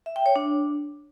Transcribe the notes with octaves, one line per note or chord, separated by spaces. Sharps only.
E5
G5
C#5
D4